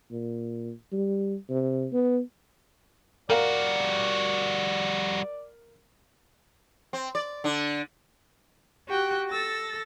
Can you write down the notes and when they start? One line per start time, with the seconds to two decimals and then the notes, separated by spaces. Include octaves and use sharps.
0.11 A#2
0.93 G3
1.50 C3
1.93 B3
3.30 G3 F#4 A#4 D5 F5
6.93 C4
7.15 D5
7.44 D3 D4
8.87 F#4 G4 G5 F#6
9.29 A4 E6 A6 A#6